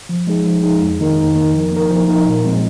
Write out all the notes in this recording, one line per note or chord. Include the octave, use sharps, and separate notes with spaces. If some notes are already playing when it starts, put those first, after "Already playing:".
F3
G#3 D#4 G#4
F3
G#3 D#4 G#4
F2
D#3 A#3 D#4 A#4
F2
D#3 A#3 D#4 A#4
F3
A#3 D#4 A#4
F3
A#3 D#4 A#4
A#2
F3 G#3 C4 F4